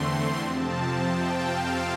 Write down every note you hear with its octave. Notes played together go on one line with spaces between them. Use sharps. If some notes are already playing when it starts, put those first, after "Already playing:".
Already playing: E2 D3 A3 C4 C6
F2 C3 F3 C4 A5
G5
F5